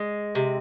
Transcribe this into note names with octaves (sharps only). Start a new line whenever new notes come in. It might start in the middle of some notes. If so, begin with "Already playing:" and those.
Already playing: G#3
C3